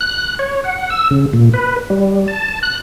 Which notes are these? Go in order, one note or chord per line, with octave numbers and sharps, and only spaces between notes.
F#6
C#5
F#5
E6
C#3
A#2
B4
G3
A5
F#6